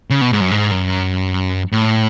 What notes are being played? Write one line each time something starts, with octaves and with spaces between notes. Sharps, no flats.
C#3
B2
G#2
F#2
G#2
F#2
A2